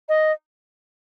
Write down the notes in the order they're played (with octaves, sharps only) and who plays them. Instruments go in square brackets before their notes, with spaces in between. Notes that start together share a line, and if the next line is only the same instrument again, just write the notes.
[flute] D#5